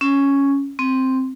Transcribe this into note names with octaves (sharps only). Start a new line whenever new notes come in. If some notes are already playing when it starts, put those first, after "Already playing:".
C#4
C4